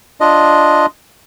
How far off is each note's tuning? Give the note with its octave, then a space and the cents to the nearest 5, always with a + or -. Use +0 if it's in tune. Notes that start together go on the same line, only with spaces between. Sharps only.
D4 +0 F4 +0 D#5 +0